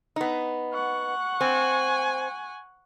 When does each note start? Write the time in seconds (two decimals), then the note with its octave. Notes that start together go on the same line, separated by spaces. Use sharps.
0.16 B3 D#4
0.73 F#5 C#6
1.41 C4 G#5